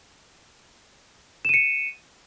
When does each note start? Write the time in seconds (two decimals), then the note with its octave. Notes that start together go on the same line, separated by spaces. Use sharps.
1.45 E7
1.49 D#7
1.54 C#7